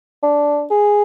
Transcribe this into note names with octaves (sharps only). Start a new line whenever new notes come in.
D4
G#4